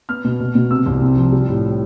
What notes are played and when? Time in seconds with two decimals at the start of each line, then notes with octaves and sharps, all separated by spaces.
0.09 B3 F6
0.25 B2
0.40 B2
0.55 B2
0.71 C3 E6
0.86 C2
1.01 C4
1.17 F3
1.32 G3
1.48 A2